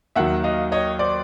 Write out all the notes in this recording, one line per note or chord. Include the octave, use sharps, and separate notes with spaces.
D#2 D#3 F#3 E5 F#5
D#5 F5
C#5 D#5
C5 D5